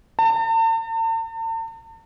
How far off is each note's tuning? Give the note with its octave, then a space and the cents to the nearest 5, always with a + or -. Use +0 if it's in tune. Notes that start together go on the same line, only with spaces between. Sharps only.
A5 +45